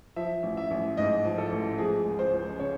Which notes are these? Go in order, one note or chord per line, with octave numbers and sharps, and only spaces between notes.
F3 E5
A1
E5
A1
G#2 D#5
F3
A4
A1
F3 G#4
C#2
C5
C#2
C#3 C#5